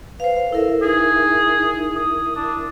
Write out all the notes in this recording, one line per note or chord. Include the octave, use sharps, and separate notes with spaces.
B4 C5 F5
E4 A4 A#4 E5
D#4 G#4
D#6
D4